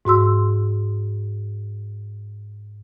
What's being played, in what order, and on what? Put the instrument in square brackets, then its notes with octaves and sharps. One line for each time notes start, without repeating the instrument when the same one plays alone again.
[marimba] G#2 F#4 C6 E6